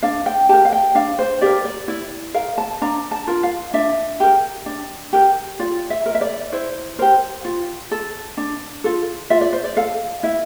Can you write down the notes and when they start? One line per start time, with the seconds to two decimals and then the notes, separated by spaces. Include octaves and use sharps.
0.03 D4 F5
0.26 G5
0.49 G4 A#4 A5
0.65 F5
0.73 G5
0.95 D4 F5
1.19 C5
1.41 G4 A#4 D5
1.65 D5
1.88 E4 D5
2.34 A#4 F5
2.58 A5
2.82 D4 A#5
3.11 A5
3.27 F4 A#4
3.43 F5
3.74 D4 E5
4.20 G4 A#4
4.66 D4
5.13 G4 A#4
5.59 F4 D5
5.90 E5
6.06 A#4
6.15 E5
6.21 D5
6.52 E4 C5
6.99 G4 A#4 C5
7.45 F4
7.91 A4
8.37 D4
8.84 F4 A4
9.30 F4 E5
9.41 D5
9.53 C5
9.64 D5
9.76 A4 F5
10.23 E4 E5